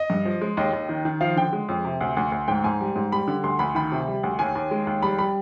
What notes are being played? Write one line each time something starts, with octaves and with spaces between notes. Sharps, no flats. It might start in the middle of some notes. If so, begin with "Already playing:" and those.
Already playing: D#5
G2
F3
G#3
D#2 D#5
D#2
D#3
D#3
F3 F5
D3 G5
G#3
F2
C3
D2
D2
D2
G#2 G5
G#2 G#5
G3
G#2
G3 B5
D3
D2 C6
D2 B5
D#3 B5
C3
G3
D2
D#2 G#5
D#2
G#3
D#2
G3 B5
G3 B5